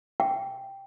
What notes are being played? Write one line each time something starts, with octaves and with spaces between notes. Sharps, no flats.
G5